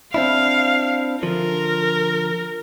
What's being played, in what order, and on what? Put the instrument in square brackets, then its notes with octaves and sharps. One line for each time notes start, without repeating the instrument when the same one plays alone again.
[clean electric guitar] C4 D4 E4 [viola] F5
[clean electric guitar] D3 F3 [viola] A#4